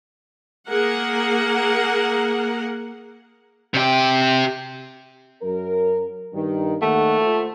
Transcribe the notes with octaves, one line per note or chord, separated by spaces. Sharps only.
A#3 G#4 A#4 F#5
C3 G4
F#2 A#4
G2 D#3
D#2 A3 F#5
F4 C5